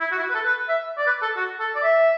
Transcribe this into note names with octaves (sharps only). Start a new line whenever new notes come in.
E4
F#4
E4
F#4
B4
A4
B4
E5
D5
B4
A4
F#4
A4
D5
E5